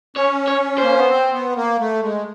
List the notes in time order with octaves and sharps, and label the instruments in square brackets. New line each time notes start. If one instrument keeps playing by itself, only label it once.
[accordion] C#4 [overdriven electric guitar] C#5
[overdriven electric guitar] C#5
[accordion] A#3 [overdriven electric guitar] C5
[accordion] B3
C4
B3
A#3
A3
G#3